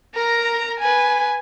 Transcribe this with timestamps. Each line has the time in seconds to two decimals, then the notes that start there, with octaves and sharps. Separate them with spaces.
0.15 A#4 A#5
0.80 B4 G#5